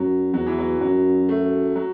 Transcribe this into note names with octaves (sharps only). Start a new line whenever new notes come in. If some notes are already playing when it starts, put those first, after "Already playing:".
Already playing: F#2 F#3
E2 F#3
E3
F#3
F#2 F#3
A3
F#3